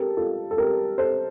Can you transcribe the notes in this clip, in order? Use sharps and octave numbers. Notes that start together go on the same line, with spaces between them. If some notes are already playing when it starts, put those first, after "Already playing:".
Already playing: G4 A4 A#4
F4 A4
A4
G4 A#4
A4 C5